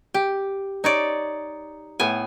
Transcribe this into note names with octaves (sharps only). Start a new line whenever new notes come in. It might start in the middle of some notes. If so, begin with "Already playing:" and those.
G4
D#4 C#5 D5
A2 B3 G#5